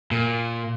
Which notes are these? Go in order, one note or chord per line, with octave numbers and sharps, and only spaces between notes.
A#2